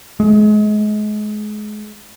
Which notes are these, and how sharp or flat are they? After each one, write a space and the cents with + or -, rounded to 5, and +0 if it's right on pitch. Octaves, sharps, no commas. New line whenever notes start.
G#3 +30